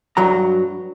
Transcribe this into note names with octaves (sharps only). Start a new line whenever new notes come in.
G2 F#3 A#5